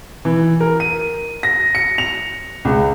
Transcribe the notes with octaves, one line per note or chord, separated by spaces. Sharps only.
E3
A#4
D#7
A#6
C#7
F7
C#2